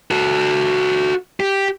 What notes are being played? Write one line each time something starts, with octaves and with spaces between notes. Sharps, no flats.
F#4 A4
G4